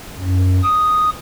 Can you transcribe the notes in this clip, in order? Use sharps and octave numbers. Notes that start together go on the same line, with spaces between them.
F#2
D#6